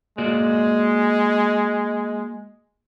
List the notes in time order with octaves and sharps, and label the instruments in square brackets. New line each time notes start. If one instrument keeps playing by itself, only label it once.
[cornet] G#3 [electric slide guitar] A#3 F#4 D5